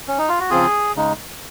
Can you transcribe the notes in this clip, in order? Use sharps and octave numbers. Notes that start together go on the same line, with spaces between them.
C#4
D#4
F4
F#4
C#3 F3 C4 F4 G#4
C#3 G#3 D#4